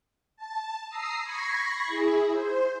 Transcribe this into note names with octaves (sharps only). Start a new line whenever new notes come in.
A5
A#5 D#6 E6 C7
B5 C#6 G#6 A#6 C7
E4 G#4
C5